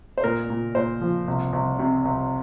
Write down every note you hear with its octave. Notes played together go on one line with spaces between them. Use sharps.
C5
A#2 A#4
A#2
A#2 C5
F3
C2
C2
C3
C2